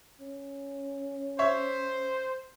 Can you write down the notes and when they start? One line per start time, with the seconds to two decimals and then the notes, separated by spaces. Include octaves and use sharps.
0.20 C#4
1.39 C5 C#5 E5 C#6